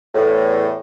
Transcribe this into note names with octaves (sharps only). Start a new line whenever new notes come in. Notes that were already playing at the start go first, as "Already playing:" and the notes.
E2 A2